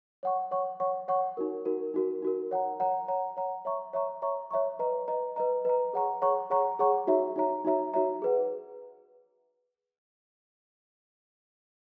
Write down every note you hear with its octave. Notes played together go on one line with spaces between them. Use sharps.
C#5 F#5 C#6
C#5 F#5 C#6
C#5 F#5 C#6
C#5 F#5 C#6
D#4 F#4 A#4
D#4 F#4 A#4
D#4 F#4 A#4
D#4 F#4 A#4
C#5 F#5 A#5
C#5 F#5 A#5
C#5 F#5 A#5
C#5 F#5 A#5
C#5 E5 A#5 C#6
C#5 E5 A#5 C#6
C#5 E5 A#5 C#6
C#5 E5 A#5 C#6
B4 D#5 A#5
B4 D#5 A#5
B4 D#5 A#5
B4 D#5 A#5
G#4 C#5 F#5 A#5 C#6
G#4 C#5 F#5 A#5 C#6
G#4 C#5 F#5 A#5 C#6
G#4 C#5 F#5 A#5 C#6
D#4 F#4 C#5 E5 A#5
D#4 F#4 C#5 E5 A#5
D#4 F#4 C#5 E5 A#5
D#4 F#4 C#5 E5 A#5
G#4 B4 F#5